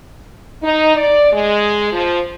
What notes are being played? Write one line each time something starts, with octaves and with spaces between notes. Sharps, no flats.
D#4
D5
G#3
F3